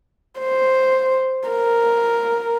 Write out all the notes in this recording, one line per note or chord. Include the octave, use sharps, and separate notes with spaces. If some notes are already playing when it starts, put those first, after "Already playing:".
C5
A#4